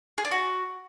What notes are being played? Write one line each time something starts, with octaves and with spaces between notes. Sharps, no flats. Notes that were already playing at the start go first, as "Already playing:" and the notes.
G#4
D4
F#4